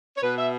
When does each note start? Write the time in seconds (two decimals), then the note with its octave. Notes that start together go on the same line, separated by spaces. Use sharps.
0.17 C#5
0.20 B2 B4
0.37 E5